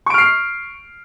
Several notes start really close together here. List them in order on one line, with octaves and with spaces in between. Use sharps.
C#6 D7 F6 C7